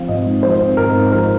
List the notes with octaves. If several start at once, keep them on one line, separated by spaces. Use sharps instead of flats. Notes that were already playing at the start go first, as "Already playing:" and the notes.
Already playing: F3 C4 F5
G#1 D#5
G#2
F3 C5
C4
G#1 A#4
G#2
F3 A#4